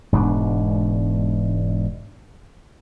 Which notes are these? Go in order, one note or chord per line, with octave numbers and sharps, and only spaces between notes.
E1 G#2 B2 D4